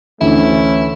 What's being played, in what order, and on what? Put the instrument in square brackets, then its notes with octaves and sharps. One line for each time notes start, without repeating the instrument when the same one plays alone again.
[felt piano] D2 [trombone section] E3 A3 C#4 [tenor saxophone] E4